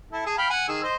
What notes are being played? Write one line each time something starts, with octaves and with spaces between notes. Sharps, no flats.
E4 A4
G#4 A5
F5 G5 B5
F#5 G#5
D#3 G#4 E6
C5 D#5